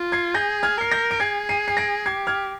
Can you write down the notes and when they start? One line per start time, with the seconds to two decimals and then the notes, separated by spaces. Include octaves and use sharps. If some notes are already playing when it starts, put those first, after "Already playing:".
Already playing: F4
0.12 G#6 C7
0.34 G#4 G6 A#6
0.63 F6 G#6
0.77 A#4 C7
0.91 G6 A#6
1.11 D7
1.20 G#4 G#6 C7
1.49 C7 D#7
1.68 C7
1.77 A#6 D7
2.06 G4 G#6 C7
2.27 F6 G#6